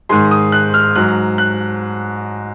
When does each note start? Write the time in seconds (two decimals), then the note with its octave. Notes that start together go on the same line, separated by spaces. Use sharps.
0.09 G#2 D#3 G#3 C6
0.31 D#6
0.52 F#6
0.74 F6
0.95 G#2 F#3 F#6
1.38 F#6